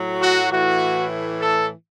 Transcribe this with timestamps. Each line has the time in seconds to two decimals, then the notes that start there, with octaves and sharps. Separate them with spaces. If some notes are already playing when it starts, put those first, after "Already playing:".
Already playing: A2 F#3
0.20 F#4
0.50 A2 E3 F#4
1.40 A4